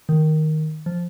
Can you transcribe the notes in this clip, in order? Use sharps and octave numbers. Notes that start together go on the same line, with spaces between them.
D#3
F3